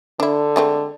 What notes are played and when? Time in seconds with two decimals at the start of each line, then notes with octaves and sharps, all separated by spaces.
0.20 D3 D4 E4
0.56 G#3 A3 C4